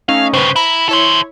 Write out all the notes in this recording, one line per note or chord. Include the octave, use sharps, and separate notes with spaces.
A3 C#4 D#4 F5
G2 C#3 B4 C5
E4 A#5 B5
E4 A4 C5 C#5